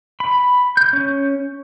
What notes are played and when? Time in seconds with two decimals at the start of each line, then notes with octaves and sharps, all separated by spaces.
0.20 B5
0.77 G6
0.93 C#4